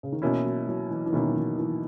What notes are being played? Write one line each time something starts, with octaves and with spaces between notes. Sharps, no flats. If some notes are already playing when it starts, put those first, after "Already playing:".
C#3
D#3
B2 E3 A#3 C#4 E4
F#3
F#3
E3
E3
B2 D#3 A#3 C#4 E4
F#3
E3
E3